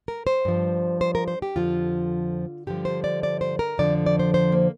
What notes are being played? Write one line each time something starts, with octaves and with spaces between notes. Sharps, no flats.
A#4
C5
G2 F3
C5
A#4
C5
G4
F2 D3 F3 F4
G2 D3 F3 G4
C5
D5
D5
C5
A#4
F2 D3 F3 D5
D5
C5
C5
A#3